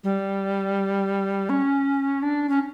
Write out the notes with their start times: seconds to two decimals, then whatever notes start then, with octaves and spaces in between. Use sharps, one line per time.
0.04 G3
1.49 C#4
2.22 D4
2.49 C#4